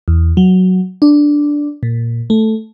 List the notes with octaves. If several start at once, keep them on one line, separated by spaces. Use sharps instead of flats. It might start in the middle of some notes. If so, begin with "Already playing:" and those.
E2
F#3
D4
A#2
A3